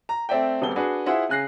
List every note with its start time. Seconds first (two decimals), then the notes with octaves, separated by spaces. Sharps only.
0.09 A#5
0.29 A3 C4 D5 E5 G5
0.62 D#1 G3 B3 C4 G#4 G7
0.76 D4 F#4 G#4 B4
1.06 E4 F4 G#4 C5 E5 F#5
1.29 C#3 G#5 F#6 A#6 C7